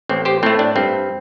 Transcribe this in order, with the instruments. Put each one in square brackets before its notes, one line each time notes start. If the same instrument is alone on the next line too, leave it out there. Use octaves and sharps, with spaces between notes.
[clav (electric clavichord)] A1 C4
G4 C5
A2 A3 C4
D4
G2 C4